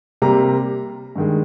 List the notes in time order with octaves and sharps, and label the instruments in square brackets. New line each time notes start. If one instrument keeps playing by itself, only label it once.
[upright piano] C3 G3 A#3 A#5
G2 D#3 G#3